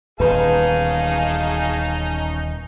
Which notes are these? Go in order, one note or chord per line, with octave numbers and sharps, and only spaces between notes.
D#1 E2 C#4 D#4 G#4 B4 F5 A5